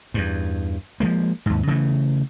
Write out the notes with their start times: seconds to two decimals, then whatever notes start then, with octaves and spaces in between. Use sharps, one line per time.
0.14 E2 G2
1.00 F3 G3 G#3 A#3
1.46 D#2 G#2
1.67 C#3 E3 A3